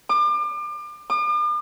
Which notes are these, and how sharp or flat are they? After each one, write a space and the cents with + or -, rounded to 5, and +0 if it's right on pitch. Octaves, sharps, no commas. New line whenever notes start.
D6 +35
D6 +45